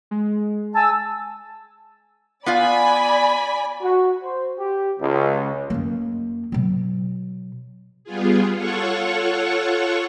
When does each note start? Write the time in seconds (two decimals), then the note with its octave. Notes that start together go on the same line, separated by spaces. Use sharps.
0.11 G#3
0.75 G#5 A5 E6
2.46 B3 F4 D5 F5 G#5 B5
3.81 F#4
4.23 C5
4.59 G4
4.98 C#2
5.70 F#2 A#3
6.52 B2 F#3
8.04 G3 B3 F4 G#4
8.53 F4 A4 C#5 F#5 C#6